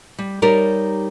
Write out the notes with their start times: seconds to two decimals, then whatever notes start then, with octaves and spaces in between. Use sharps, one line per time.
0.19 G3
0.42 G3 D#4 G4 A#4 C#5 D5